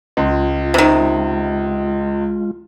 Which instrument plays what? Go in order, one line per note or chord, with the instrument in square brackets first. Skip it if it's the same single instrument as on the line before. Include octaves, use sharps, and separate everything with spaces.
[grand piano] C#2 [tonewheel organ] G#3 F4
[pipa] C3 D#3